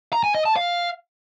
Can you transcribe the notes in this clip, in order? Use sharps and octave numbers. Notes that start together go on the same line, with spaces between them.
A#5
G#5
D#5
A5
F5